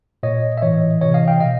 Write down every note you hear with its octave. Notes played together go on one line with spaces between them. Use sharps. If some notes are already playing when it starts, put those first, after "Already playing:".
A#2 C#5 D#5
E5
A2 E3 C#5 D#5
C3 E3 C#5 D#5
D#5 F5
F5 G5
B2 D#5 F5